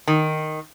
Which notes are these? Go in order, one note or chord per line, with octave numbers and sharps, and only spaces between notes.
D#3